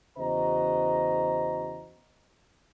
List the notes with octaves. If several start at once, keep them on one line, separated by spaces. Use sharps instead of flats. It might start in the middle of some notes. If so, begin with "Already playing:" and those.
E2 C#3 F#4 C5 D#5 A#5